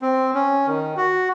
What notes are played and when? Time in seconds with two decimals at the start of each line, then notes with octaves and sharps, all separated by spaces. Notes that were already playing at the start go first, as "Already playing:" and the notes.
0.02 C4
0.34 C#4
0.67 D#3
0.97 F#4